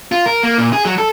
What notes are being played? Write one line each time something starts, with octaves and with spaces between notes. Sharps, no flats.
F4
A#4
A#3
A#2
G#4
F#3
A4